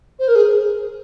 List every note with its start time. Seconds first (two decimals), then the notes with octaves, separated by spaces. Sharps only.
0.19 C5
0.28 A#4
0.35 G#4